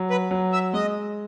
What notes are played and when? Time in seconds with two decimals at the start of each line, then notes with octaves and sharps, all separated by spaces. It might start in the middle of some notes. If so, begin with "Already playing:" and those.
Already playing: F#3
0.10 B4
0.31 F#3
0.53 E5
0.73 G#3 D#5